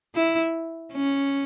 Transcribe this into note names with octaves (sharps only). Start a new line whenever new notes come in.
E4
C#4